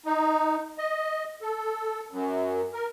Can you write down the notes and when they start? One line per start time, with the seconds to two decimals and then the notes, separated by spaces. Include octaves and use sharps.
0.06 D#4
0.78 D#5
1.42 A4
2.11 F#2
2.74 A#4